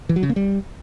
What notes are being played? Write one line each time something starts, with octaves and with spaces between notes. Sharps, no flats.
E3
F#3
C#3
A#3
G3